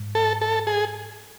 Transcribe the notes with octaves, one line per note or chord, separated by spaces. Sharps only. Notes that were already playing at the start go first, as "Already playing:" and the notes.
Already playing: G#2
A4
A4
G#4